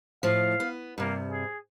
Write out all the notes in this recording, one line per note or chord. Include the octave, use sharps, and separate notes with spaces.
A2 F3 F5
B3
G2 C3 A#3
G#4